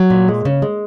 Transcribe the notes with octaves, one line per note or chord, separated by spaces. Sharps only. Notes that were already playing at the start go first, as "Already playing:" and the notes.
Already playing: F#3
A#2
G#3
C#3
G#3